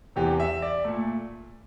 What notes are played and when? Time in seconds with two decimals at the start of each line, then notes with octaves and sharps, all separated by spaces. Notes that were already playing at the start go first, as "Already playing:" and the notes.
0.16 E2 C3 E3 G4
0.40 E5
0.62 D5
0.84 A#2 A3